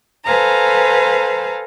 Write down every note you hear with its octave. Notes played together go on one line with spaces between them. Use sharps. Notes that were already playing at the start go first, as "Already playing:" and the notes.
A4 B4 C5 F5 G#5 A#5